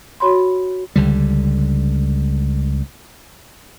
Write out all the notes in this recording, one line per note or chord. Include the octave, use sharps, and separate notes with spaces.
F#4 C#5 B5 C6
C#2 D3 G3